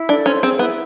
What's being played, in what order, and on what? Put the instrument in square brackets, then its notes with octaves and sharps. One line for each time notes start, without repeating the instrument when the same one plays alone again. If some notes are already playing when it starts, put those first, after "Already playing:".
Already playing: [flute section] E4
[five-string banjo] D4 [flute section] A4
[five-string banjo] C#4 [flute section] C5
[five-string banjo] C4 [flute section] G#4
[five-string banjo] B3 [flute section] E4